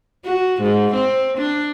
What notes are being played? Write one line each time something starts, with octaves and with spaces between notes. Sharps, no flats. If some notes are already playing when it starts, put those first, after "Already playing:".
F#4
G#2
C4
D4